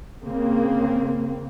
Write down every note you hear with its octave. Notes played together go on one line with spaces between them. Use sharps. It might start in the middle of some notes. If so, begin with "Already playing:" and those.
C#3 A#3 C4